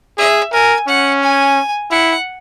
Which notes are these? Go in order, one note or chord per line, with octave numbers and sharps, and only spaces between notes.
G#4 E5
A#4 G#5
C#4 F#5
G#5
E4 F#5